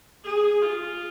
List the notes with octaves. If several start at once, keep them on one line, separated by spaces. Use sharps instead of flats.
G#4
F4